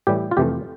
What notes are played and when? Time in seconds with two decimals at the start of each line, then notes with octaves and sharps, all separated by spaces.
0.07 A2 E3 G3 G4
0.31 F4
0.37 F2 C3 E3 A3 G4